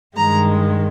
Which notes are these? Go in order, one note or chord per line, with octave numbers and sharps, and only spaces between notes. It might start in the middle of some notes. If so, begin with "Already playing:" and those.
G2 D#3 G#3 A#5